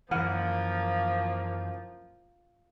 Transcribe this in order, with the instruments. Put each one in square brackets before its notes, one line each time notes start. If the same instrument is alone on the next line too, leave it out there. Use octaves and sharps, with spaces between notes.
[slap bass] F#2 E3 [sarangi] F3 [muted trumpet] A#3 [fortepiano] F#5 F6